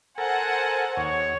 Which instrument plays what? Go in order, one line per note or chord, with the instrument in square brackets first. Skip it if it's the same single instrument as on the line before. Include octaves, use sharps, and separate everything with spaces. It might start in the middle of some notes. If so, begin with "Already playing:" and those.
[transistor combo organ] A4 A#4 [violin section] C5 F#5 [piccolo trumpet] G#5
[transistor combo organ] D#2 [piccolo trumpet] C#5